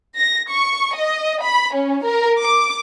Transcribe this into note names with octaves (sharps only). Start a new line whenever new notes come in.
A#6
C#6
D#5
B5
C#4
A#4
D6